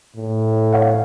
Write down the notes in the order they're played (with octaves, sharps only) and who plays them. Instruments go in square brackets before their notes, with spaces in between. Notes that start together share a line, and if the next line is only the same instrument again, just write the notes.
[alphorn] A2
[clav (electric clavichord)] C#5 F5 F#5